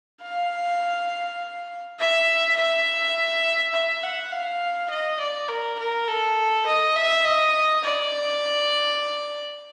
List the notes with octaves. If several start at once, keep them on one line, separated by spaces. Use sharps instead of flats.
F5
E5
E5
E5
F#5
F5
D#5
D5
A#4
A#4
A4
D#5
E5
D#5
D5